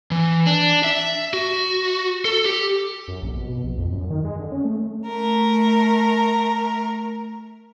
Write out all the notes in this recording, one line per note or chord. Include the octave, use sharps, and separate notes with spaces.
E3
D4
E5
F#4
A4
G4
F#2
A#1
B2
B2
A#1
F2
F#2
D#3
G#3
D3
C#4
A3
A3 A#4 A#5